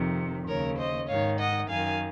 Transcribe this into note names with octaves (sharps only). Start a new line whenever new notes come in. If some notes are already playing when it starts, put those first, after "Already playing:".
Already playing: F2 C3 D#3
D#2 C#3 A#4 C#5
C5 D#5
G#2 D#3 C#5 F5
D#5 F#5
F#2 D#3 F5 G#5